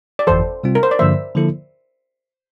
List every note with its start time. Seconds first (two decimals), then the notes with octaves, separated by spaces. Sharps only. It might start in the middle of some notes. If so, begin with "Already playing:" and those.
0.19 D5
0.27 G1 F2 E3 A4 C5
0.64 C3 G3 C4 F4
0.75 A#4
0.83 C5
0.91 D5
0.99 G2 D3 F3 A#3 C5 E5
1.35 D3 F3 A#3 E4 A4